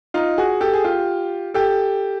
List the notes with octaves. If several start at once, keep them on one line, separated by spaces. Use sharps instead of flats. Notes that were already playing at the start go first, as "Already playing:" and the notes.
D#4 F4
F#4 G#4
G4 A4
G#4
F4 G4
G4 A4